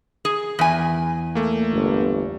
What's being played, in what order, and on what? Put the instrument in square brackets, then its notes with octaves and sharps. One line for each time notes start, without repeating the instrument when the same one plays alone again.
[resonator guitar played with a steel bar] G#4
E2 G#5
[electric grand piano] A3 A#3
[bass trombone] G1